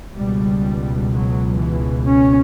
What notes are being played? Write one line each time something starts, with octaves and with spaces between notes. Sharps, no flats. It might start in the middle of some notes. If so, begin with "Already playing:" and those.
C#2 B2 G3
F#3
E3
C#4